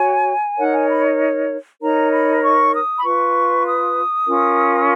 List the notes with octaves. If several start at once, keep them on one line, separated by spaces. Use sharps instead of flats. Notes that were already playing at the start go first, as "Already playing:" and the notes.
Already playing: F#4 C#5 G#5
D#4 A#4 C#5 F#5
G#5
B5
D#4 A#4 C#5 A#5
B5
C#6
D#6
B5
F4 B4 C#6
D#6
C#4 F4 A#4